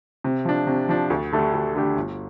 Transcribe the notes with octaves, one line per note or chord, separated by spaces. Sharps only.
C3
F3 D4
C3
F3 D4
D2
D3 A3 D4 G4
D2
D3 A3 D4 G4
G1